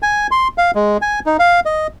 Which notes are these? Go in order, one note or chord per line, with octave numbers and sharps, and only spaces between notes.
G#5
C6
F5
G#3
G#5
D#4
F5
D#5